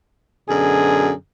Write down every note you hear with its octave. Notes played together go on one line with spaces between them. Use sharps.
F#2 B2 D3 G#4